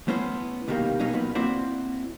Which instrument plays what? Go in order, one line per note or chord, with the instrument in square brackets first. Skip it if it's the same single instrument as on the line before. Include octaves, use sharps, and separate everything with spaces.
[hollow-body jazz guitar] A3 B3 C#4 E4 C5
C2 B2 D#3 F#3 G3 A#3
B2 F#3 A#3 C#4 D#4
F2 A#2 D#3 B3
A#3 C4 E4 F#4 C5 D5